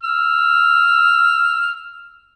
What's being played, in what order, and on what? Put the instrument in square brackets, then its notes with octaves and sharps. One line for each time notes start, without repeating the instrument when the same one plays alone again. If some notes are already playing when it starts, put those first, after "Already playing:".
[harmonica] E6 F6